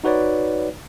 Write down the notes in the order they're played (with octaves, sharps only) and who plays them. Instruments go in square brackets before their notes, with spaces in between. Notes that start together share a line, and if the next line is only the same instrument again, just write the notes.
[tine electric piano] D#4 F#4 B4 C#5 D5